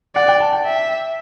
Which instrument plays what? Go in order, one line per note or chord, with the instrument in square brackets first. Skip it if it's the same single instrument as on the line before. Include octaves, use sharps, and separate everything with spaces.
[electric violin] D5 [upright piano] F#5
[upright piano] G5
A5
G5
[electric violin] E5